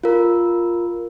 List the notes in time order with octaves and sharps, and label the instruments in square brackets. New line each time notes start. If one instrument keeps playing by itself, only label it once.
[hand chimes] F4 A#4